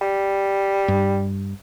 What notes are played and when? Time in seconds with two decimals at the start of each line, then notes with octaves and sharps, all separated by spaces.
0.01 G3
0.88 G2